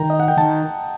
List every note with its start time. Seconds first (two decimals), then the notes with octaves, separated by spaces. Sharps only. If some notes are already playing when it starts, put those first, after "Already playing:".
Already playing: D#3 G5 A#5
0.10 D#5
0.20 F#5
0.28 G5
0.37 D#3 A5